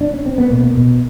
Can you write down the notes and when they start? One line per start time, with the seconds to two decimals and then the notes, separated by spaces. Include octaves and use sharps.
0.01 D4
0.14 C#4
0.26 C4
0.38 B3
0.50 B2 A#3
0.75 B2